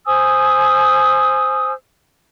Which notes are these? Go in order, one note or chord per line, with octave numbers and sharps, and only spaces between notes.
C5 G#5 D#6 E6